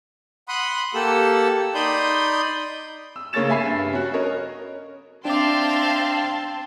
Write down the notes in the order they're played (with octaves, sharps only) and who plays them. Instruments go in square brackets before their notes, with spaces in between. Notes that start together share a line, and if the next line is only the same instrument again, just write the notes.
[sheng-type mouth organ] F#5 B5 C6 D#6 F#6
A#3 G4 A4 F#5 E6
D#4 D5 B5 C6 D#6 G6
[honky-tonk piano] E6
C#3 A#3 C#5 C#6 A6 E7
E5 G#5 B5 C7
G2
C#4 F#4
A#4 C#5 D#5
[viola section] C4 A5 C6 [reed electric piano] D4 D6 [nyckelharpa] E5 G5 [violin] F5